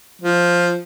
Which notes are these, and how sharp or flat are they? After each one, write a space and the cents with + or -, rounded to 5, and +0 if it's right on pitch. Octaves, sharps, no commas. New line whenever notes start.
F3 +5